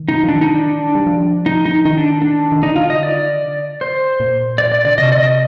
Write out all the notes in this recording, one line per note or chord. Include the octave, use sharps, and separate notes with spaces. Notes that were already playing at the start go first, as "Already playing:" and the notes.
Already playing: D#3
D#4
F3
D#3 D4
D#4
D4
G3
F3
D#4
D#4
D#3 D#4
D4
D4
D#3
D3 D#4
F4
D#5
D5
C5
A#2
D5
D5
D3 D5
C3 D#5
D5
D#5